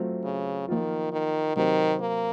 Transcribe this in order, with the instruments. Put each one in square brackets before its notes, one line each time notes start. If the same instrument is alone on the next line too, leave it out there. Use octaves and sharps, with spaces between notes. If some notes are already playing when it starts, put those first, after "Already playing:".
Already playing: [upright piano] F#3 A3 C4 F4
[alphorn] C#3
[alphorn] D#3 [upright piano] F3 A#3 F4
[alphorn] D#3
[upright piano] C3 F#3 C4 [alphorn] D#3
[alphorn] A#3